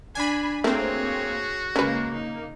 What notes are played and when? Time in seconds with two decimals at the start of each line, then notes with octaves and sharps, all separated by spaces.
0.15 D4 G#5 B5
0.64 A3 A#3 C4 F#4 G#4 C#5
1.76 C#3 G#3 A#3 C#4 B4
2.14 D#4